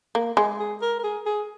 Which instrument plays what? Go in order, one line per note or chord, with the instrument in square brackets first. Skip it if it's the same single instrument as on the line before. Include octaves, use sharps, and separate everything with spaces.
[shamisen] A#3
G#3
[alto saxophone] G#4
A#4
A#4
G#4
G#4